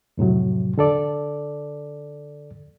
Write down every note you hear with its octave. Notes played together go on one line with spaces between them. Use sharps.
F2 A2 C3 F#3
D3 A4 D5